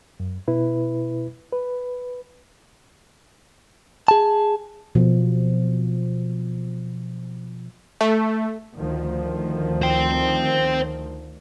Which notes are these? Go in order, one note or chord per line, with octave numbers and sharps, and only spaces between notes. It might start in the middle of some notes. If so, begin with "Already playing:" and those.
F#2
B2 E4 B4
B4
G#4 A5
B2 F3
A3
D2 D#3 F3
C5 G5